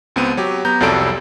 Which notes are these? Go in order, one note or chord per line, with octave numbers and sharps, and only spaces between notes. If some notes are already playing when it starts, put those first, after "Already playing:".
C#2 B3 C4 D#7
F#3 G4
B3 A#5 G6
C2 F2 F#3 G3 A4 D7